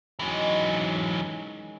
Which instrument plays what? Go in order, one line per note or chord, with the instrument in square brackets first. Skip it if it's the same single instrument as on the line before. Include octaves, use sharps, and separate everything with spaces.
[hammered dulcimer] D#3 G#3 C#4 [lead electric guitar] E3 F#3